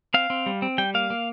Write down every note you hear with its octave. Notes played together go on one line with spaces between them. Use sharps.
C4 F5
C4
G3
C4
G3 G5
A#3 F5
A#3